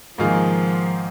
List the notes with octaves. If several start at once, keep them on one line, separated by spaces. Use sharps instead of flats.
G#2 D#3 F3 A#3 F4 G#4